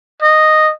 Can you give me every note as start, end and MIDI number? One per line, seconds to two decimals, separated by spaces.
0.22 0.72 75